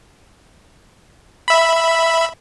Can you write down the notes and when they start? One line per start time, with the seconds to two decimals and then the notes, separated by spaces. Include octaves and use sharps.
1.48 E5 B5